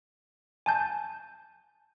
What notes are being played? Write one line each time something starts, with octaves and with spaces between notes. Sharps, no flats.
G#5 A5 G6